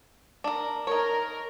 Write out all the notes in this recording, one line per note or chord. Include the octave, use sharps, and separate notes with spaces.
D4 A#4
D#4 A#4 C#5